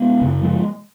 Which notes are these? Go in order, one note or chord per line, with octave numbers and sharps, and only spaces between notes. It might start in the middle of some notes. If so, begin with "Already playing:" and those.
Already playing: G#3 B3
F#2 C#3
F3 G#3